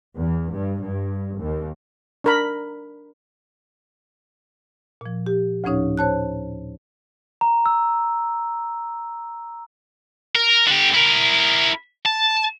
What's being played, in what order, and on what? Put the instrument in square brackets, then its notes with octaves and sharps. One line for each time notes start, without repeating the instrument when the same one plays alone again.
[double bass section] E2
G2
G2
D#2
[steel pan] D4 A#4 B5
[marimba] A#2 F3
G4
D2 A2 F3 C#4 D#4 C#5
C5 C#5 A5 F#6
[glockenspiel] A#5
E6
[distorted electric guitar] A#4
D3 G4
E4 A#4
A5